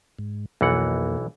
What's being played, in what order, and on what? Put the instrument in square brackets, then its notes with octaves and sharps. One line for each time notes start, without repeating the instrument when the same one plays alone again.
[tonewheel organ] G#2
[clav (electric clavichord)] B1 E3 F#5 [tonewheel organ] F2 A#3